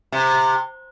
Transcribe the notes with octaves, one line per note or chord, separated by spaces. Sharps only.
C3